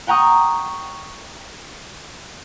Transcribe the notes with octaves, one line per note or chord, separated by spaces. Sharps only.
F#5 G5 A#5 C#6 D#6